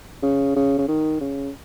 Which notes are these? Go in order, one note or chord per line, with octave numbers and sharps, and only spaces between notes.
C#3
C#3
C#3
D#3
C#3